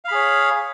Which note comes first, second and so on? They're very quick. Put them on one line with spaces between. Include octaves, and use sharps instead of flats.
F5 B5 G#4 C#5